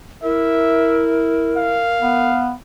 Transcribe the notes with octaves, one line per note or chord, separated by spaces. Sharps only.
E4 A#4 E5
F5
B3